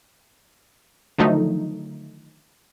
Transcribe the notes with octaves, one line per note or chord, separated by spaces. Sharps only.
D3 D#3 F3 F#3 A3 D#4